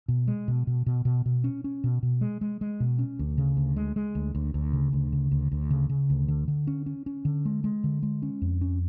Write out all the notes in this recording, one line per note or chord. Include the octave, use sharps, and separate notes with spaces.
B2
G#3
B2
B2
B2
B2
B2
C#4
C#4
B2
B2
G#3
G#3
G#3
B2
C#4
D2
C#3
D2
G#3
G#3
D2
D2
D2
C#3
D2
C#3
D2
D2
C#3
C#3
D2
D3
D3
C#4
C#4
C#4
D3
G#3
G#3
D3
G#3
C#4
F2
C#4